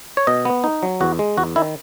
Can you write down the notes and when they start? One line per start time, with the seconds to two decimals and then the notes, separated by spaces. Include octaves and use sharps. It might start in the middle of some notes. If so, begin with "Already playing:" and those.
0.17 C#5
0.27 B2 D#5
0.45 B3
0.64 D#4
0.83 F#3
1.01 E2 F#4
1.19 G#3
1.37 E2 F#4
1.56 D#3 E4